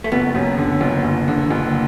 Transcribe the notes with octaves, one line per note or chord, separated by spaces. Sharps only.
A3
F#1 B3
F#2
D3
F#1
F#1
D3
F#1